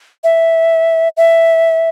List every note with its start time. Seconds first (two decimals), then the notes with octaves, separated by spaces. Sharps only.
0.24 E5
1.17 E5